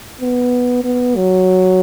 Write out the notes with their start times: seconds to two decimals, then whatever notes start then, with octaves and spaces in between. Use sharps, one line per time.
0.21 B3
0.84 B3
1.16 F#3